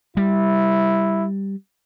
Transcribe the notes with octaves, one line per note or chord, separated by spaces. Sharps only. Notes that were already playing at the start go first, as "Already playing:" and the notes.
G3 E4